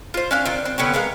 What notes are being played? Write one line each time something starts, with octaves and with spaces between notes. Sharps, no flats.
F4 C5
C#4 D4 F5
D#3 C4 F4
C4
D3 B3 C#4 G4
G#3 B3 A#4 F5